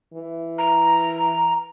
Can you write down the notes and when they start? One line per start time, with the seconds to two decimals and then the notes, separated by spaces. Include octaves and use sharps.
0.14 E3
0.58 A#5